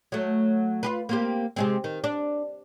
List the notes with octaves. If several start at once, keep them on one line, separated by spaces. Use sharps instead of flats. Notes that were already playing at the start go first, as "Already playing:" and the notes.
F#3 A3
F4 G4 B4
A#3 C4 G4
C3 G#3 C4
D#3
D4